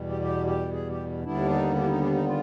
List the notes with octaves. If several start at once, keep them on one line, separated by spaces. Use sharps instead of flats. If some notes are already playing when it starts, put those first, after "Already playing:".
Already playing: E2 B2 G3
G4
G4
G4
G#4
G4
D#2 D3 G3 B3 D4 E4
D#4
D4
E4
D#4
D4
D#4
F4